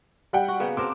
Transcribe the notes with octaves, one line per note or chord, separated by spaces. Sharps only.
G3 F#5 G5
F#4
C#3 A#3 B3
C4 D4 A#4 D6